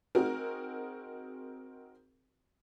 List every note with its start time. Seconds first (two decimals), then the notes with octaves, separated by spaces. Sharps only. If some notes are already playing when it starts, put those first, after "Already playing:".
0.15 C4 D#4 F#4 G#4 A#4